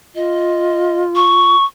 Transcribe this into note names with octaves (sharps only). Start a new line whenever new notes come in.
F4 D#5
C#6